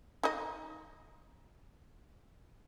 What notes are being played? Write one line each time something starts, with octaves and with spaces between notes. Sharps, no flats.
D#4 D#5